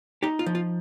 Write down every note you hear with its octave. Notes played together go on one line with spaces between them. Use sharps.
D#4 G4
F4
F3
F4